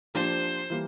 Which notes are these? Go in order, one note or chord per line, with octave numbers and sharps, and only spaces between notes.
F3 A#3 D4 G4 C5
E3 G3 A#3